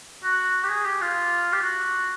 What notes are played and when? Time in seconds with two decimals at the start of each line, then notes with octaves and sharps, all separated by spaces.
0.23 F#4
0.63 G4
0.69 G#4
0.85 G4
1.01 F4
1.52 G4
1.62 F#4